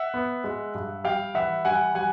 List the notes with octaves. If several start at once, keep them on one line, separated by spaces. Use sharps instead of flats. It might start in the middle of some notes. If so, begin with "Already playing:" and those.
Already playing: E5 F#5
B3
G#3
G2
G3 F5 G5
E3 E5 F#5
G3 F#5 G#5
G3 F#5 G#5